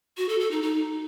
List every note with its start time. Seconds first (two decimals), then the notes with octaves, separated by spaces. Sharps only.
0.17 F#4
0.29 A4
0.40 A4
0.51 D#4
0.62 D#4